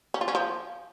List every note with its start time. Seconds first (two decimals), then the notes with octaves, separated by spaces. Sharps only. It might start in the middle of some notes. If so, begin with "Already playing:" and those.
0.14 C#4
0.21 F4
0.28 C#4
0.35 F3